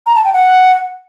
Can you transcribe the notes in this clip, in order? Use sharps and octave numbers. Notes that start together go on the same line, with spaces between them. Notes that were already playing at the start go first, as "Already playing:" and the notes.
A#5
A5
G5
F#5